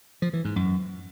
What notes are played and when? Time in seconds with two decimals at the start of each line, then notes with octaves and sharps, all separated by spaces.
0.22 F3
0.33 E3
0.45 G#2
0.56 F#2